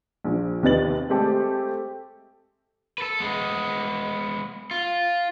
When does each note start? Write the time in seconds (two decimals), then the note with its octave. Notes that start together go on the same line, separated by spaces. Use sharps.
0.24 A#1 F3
0.63 D#2 C3 B4 D#5 A6 F#7
1.09 G#3 A3 C4 G4 A4
2.98 A4 B4
3.20 G#3 B3
4.71 F4